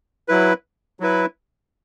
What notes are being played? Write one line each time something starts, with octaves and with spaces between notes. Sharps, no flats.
F#3 E4 B4
F#3 E4 B4